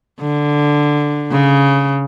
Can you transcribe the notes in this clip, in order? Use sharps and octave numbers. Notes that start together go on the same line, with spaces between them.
D3
C#3